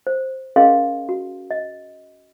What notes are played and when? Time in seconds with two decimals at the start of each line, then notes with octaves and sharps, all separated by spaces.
0.07 C5
0.56 C#4 G#4 A#4 D#5 F5 C6
1.09 F#4
1.51 D#5